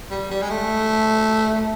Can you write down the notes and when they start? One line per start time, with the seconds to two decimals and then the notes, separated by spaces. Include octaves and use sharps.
0.11 G3
0.31 G3
0.42 G#3
0.50 A3